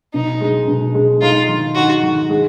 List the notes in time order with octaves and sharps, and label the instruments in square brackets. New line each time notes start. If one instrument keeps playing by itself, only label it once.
[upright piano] B2 [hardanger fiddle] D#4
[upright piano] G#3
B2
G#3
[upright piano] D#4 [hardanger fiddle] F4
[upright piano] D#3
[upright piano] D#4 [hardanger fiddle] F#4
[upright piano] D#3
G#3